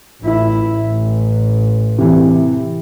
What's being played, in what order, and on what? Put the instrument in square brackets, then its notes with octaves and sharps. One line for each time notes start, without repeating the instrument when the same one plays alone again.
[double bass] A1 E4
A1
[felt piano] C3 E3